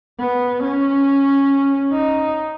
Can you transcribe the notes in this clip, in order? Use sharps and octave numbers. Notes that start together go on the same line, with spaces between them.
B3
C#4
D#4